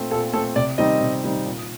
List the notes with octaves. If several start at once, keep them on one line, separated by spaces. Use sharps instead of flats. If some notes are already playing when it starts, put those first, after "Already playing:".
Already playing: A#2 A3 C4
A#2 A4
A3 C4 A4
C3 D5
D#3 G3 C4 D#4 D#5
C3
D#3 G3 C4 D#4
A#2